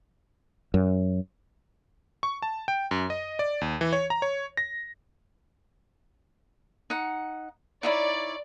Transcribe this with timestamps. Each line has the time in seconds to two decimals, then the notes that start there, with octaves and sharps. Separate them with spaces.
0.74 F#2
2.23 C#6
2.42 A5
2.68 G5
2.91 F#2
3.10 D#5
3.39 D5
3.61 D#2
3.81 E3
3.93 C#5
4.10 A#5
4.22 C#5
4.57 A#6
6.90 D#4 F#5
7.83 D#4 E4 C#5 D5